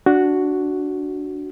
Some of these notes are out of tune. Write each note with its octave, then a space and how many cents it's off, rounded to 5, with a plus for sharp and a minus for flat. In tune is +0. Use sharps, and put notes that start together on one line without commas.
D4 -5 F#4 +0